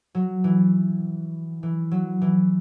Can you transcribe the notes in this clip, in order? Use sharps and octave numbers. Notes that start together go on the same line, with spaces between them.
F#3
E3
E3
F#3
E3